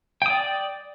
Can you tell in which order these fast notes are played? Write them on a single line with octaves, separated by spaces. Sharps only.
G5 D#6 D5